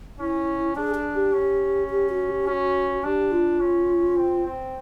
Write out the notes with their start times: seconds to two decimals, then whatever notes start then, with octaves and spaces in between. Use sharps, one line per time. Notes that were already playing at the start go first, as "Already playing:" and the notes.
0.19 C#4 E4
0.76 D4 G#4
0.95 G#4
1.15 G4
1.33 C#4
1.90 G4
2.09 F#4
2.28 G4
2.47 C#4 F#4
3.04 D4 G4
3.31 F4
3.60 C#4
4.16 C4
4.46 C4